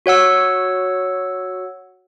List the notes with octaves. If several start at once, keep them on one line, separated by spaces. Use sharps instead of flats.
F#4 C#5 F#5 E6